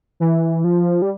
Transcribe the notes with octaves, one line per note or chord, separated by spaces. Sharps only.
E3
F3
G3